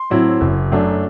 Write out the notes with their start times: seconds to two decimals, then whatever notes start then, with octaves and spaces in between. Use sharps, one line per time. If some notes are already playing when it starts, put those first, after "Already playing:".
Already playing: C6
0.10 A2 F#3 C4 E4
0.41 F#1
0.72 F#2 F#3 A3 D4